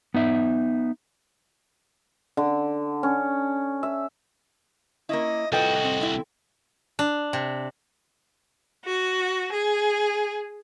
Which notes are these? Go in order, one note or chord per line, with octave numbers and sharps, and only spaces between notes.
B3 D#4 E5
D3
C#4
E5
A#3 C#4 E4 D#5
C2 F4 F#4 A4 B4 D#5 G5
C4
C4 E4
D4
C3
F#4
G#4